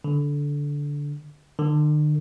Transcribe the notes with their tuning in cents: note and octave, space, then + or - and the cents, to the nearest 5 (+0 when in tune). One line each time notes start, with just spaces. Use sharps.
D3 -15
D3 +45